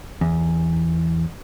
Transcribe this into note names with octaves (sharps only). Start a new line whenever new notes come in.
E2